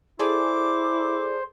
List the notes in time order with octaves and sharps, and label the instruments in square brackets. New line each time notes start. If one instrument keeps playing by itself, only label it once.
[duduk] E4 [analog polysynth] G#4 A4 D5 [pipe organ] C5 [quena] D6